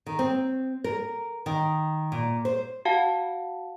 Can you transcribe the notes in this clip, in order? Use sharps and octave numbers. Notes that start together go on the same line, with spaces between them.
D#3
C4
A#4
D#3
A#2
C5
F#4 F5 F#5 A5